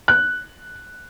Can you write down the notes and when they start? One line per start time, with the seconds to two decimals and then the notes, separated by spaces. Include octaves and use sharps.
0.08 F#6